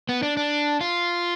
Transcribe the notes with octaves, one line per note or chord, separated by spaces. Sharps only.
B3
D4
D4
F4